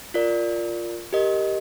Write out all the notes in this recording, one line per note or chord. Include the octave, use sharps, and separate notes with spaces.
F4 A#4 D5
G4 A#4 D#5